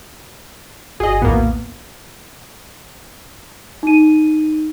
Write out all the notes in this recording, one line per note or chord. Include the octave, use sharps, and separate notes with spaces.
G1 F#4 G#4 D#5 C7
A#1 D#2 A2 A#3 B3
D#4 D#7